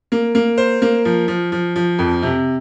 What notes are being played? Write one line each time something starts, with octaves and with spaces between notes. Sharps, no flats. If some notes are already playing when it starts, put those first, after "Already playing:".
A#3
A#3
C5
A#3
F3
F3
F3
F3
F2
C3